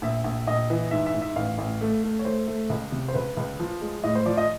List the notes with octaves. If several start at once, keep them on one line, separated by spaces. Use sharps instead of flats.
A#1 E5
A#1
A#1 D#5
E3
G#2 E5
E5
G#2
E5
A1 F5
A1
A3
A3
C#5
A3 C5
A3
C#2
C3
C5
C#2 B4
C#2
F3
G#3
A2 D#5
C5
F3 D5
D#5